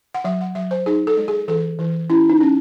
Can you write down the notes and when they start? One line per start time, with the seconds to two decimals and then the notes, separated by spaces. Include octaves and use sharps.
0.14 F#5
0.24 F#3 E5
0.41 F#5
0.55 F#3 E5
0.71 C5
0.86 D#4 G#4
1.07 A4
1.17 G#3
1.28 G#4
1.48 E3 A4
1.79 E3
2.10 C#4 E4
2.30 D#4
2.40 C#4